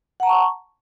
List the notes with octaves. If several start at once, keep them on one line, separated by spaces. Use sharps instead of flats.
F#5 A5 A#5 C#6